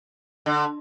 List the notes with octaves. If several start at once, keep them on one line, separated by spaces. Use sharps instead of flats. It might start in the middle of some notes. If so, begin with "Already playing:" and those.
D3